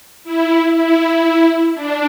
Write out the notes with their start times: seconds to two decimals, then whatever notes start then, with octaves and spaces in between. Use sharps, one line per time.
0.24 E4
0.74 E4
1.75 D4